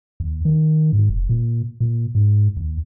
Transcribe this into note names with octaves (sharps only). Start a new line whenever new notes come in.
D#2
D#3
G#2
F1
A#2
A#2
G#2
D#2